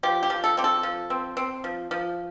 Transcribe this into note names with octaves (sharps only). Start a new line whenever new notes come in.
F3 G4
G4
F3
A4
C4 G4
A4
F3
C4
C4
F3
F3